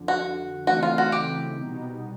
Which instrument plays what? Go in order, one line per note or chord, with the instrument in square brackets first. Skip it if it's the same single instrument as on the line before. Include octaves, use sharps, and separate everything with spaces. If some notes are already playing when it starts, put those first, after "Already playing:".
Already playing: [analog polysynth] F2 D3 F3
[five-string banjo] F#4
[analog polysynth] C#3 E3 A3 C4 D#4 [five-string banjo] F#4
[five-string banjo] F4
F#4
G4
[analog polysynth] C2 B2 G3 B3 D#4